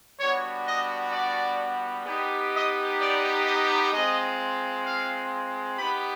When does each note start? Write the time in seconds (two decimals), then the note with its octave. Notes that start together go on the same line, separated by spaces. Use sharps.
0.19 G3 B3 D4 F#4 C#5
0.67 D#5
1.12 D5
2.06 B3 D#4 G4
2.52 D#5
3.00 D5
3.45 D#5
3.92 G#3 C4 F4 D#5
4.85 F5
5.78 B3 D#4 G4 B5